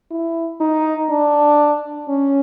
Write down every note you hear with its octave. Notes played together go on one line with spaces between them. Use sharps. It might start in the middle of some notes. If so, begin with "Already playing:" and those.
E4
D#4
D4
C#4